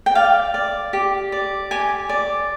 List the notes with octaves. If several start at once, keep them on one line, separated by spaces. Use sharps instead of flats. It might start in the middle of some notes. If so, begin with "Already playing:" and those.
G5
D5 F5
D5
G4
D5
G4 G#5
D5